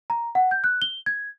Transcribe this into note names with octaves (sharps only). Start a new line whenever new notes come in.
A#5
F#5
G6
F#6
G7
G#6